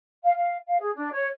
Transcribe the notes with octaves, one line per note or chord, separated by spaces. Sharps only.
F5
F5
F5
G#4
D4
C#5